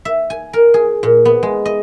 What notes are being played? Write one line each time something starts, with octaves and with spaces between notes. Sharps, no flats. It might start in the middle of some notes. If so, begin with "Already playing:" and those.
E5
G#5
A#4
G#4
A#2
B3
G#3
D#5